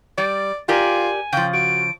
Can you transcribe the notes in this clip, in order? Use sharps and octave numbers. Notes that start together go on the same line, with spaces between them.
G3 D5
F4 G4 A#4 D5 G#5
C#3 F3 G5
F#4 D7